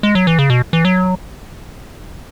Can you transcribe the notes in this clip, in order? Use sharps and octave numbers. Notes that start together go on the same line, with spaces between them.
G#3
F#3
E3
C#3
B2
E3
F#3